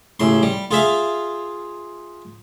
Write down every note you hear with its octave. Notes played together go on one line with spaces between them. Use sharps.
A1 C#3 C6
G3
F4 G#4 E5 F5